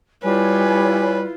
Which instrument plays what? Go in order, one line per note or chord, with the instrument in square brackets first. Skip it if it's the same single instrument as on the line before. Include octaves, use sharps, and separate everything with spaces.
[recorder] G3 [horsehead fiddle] E4 F4 [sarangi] B4 [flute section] C#5 G#5